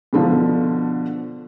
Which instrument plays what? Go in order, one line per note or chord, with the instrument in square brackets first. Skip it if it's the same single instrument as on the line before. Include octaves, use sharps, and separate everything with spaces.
[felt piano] B2 D3 F3